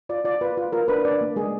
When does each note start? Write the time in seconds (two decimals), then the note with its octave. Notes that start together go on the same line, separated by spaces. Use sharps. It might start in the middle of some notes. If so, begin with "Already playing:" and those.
0.09 F4 D5
0.24 F4 D5
0.41 F4 B4
0.57 F4
0.72 F4 A#4
0.88 D4 B4
1.05 D4 D5
1.21 A#3
1.36 G#3 G#4